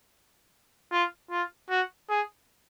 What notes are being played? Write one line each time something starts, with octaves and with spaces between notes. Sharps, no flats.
F4
F4
F#4
G#4